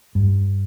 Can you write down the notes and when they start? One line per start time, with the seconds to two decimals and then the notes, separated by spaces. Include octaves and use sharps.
0.15 G2